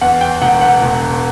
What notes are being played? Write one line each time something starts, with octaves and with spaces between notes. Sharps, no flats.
E2 F#5
G5
E1 F#5
F#5
E1